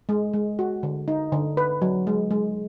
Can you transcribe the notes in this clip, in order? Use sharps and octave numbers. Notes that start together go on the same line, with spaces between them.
G#3
G#3
F#4
D3
D#4
D3
B4
F#3
G#3
G#3